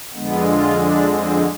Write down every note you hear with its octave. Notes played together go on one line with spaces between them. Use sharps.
F2 D3 G#3 B3
F4
D4
C4